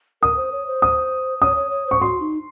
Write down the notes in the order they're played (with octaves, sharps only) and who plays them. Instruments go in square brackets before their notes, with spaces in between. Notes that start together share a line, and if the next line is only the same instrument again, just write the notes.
[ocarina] A#4 [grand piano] D#6
[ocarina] C5
C#5
C5
[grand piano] D#6
[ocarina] C#5 [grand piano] D#6
[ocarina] C#5
C#5
[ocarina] C5 [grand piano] C#6
[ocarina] F#4 [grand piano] C6
[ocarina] D#4